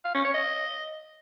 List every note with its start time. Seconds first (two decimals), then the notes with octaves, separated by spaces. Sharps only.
0.05 F5
0.15 C#4
0.24 C#5
0.34 D#5